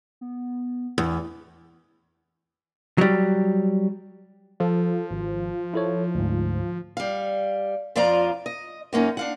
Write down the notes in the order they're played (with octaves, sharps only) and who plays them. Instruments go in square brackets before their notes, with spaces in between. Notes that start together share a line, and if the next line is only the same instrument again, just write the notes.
[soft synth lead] B3
[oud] E2
[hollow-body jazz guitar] F#3 G3
[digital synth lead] F3 [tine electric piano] A4
[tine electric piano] G#1
E4 A4 C#5
D2 G#2
[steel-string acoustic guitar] G3 F5
F2 F3 F4 D5 F5 A#5
D#5
F#2 A#3 C#4 D#4
D4 F5 F#5